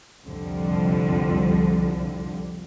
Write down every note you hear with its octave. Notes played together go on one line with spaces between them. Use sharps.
C2 F2 D3 F3